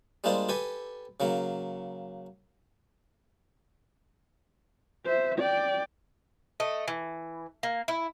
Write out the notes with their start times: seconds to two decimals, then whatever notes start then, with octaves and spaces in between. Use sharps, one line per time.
0.24 G3 G#3 A#3 D4 F4 C5
0.49 G4 A4 B4 G#5
1.20 C#3 F#3 A#3
5.06 C5 E5
5.39 D5 G5
6.60 A3 D#5
6.88 E3
7.63 A#3
7.88 E4